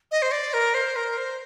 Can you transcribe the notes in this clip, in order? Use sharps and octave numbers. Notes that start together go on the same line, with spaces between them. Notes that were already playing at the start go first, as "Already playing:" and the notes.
D#5
C5
D5
A#4
C5
A#4
C5